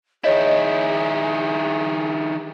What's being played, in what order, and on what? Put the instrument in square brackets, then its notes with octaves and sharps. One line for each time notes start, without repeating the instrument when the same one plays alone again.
[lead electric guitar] D#3 E4 [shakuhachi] G#4 [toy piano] C#5 D#5